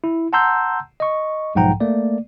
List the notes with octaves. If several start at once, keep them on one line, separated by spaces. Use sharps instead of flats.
E4
F#5 A5 A#5 C6 E6 G6
D#5 C#6
B1 G#2 F3 F#5 G5 A#5
A3 A#3 D5